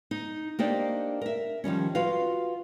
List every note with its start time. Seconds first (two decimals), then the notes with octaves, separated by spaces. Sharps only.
0.11 D#4
0.59 A#3 D4 D#4 G4 C5 D5
1.21 A#4 E5
1.64 D#3 F3 G3 C#4
1.95 F4 F#4 B4 F5